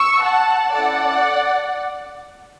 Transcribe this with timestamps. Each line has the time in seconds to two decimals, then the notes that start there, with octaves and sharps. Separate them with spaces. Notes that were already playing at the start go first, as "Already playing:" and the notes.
Already playing: C#6 E6
0.22 F#5 A5
0.73 C#4 E4 A4 D5 F#5